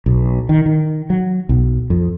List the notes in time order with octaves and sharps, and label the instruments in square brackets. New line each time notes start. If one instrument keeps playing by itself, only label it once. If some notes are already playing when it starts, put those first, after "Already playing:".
[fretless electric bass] B1
D#3
D#3
F#3
B1
F2